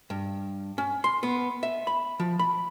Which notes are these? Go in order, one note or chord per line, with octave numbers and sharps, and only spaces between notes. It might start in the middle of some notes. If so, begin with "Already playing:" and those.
G2
C#4
C6
B3
E5
B5
F3
B5